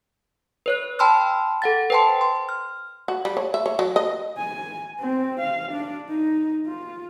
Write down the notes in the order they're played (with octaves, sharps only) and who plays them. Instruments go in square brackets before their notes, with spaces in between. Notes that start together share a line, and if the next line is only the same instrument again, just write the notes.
[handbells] B4 C#5 F#6
G5 A5 B5 C6 E6 F6
A4 F#5 A6
B4 C5 G5 A5 C6
C6
F6
[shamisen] F#4
G3
C#5
E5
C#5
F#3
D#5
[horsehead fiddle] G#5
C4
F5
D4
D#4
F4